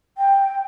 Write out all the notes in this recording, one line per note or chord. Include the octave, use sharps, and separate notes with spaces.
G5